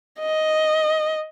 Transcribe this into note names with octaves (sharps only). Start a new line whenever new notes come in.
D#5